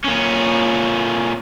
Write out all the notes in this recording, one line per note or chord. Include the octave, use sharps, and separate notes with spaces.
A#2 C#4